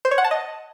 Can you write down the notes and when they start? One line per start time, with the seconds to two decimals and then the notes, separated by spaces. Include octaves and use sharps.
0.05 C5
0.11 C#5
0.18 F#5
0.24 A5
0.31 D#5